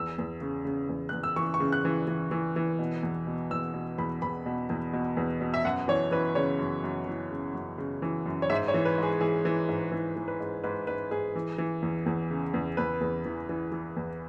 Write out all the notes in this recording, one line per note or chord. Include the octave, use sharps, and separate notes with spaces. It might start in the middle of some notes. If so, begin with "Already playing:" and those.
Already playing: E2 E6
E2
C#3
C#3
E2
E2 F#6
E6
E3 C#6
C#6
C#3
F#6
E3
E3
E3
E3
B2
E2
B2
E2 E6
B2
E2 B5
E2 B5
B2
E2
B2
E2
B2
E5
F#2 F#5
E3 C#5
E3 B4
C#3 C#5
F#2
F#2
E3
C#3
F#2
C#3
E3
F#2
C#5
G#2 E5
C#5
E3
B4
G#2 G#4
E3 G#4
E3
G#2
E3
E3
B4
G#2
G#2 B4
G#2 B4
G#2 G#4
E3
E3
E2
E2
C#3
E2
E2 B4
E2
E3
E3
E3
E2